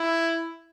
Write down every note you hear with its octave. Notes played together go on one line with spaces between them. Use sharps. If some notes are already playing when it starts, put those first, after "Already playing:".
Already playing: E4